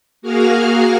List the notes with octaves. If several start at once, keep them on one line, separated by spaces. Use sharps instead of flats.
A#3 F#4 G#4 A#4 F5 F6